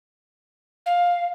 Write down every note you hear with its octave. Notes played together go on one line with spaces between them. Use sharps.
F5